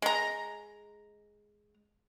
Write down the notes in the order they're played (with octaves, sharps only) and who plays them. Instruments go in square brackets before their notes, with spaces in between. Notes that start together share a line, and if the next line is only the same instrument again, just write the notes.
[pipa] G#3 A#5